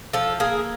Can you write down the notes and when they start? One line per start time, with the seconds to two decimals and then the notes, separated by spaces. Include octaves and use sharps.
0.13 F3 A4
0.40 A#3 G#4